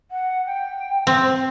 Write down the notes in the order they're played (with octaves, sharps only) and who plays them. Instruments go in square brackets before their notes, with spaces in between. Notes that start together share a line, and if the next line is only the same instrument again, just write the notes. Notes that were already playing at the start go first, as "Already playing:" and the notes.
[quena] F#5
G5
[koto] C4